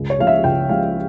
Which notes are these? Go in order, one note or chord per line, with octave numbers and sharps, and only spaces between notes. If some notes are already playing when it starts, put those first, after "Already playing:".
Already playing: C#2
C#5
C#3 F3 G#3 F5
E5
C#2 G5
C#3 F3 G#3 F5